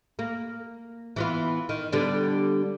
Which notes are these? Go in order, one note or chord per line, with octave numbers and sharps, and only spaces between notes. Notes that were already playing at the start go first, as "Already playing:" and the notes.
A#3
E3 B3 F4
D#3
D3 G3 B3